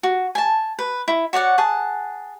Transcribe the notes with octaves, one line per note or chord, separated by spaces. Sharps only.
F#4
G#5 A5
B4
E4
F#4 C#5 D5 F#5
G#4 F#5 A5